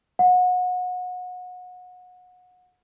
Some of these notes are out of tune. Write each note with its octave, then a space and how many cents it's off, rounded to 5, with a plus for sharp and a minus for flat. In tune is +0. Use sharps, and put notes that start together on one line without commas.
F#5 -30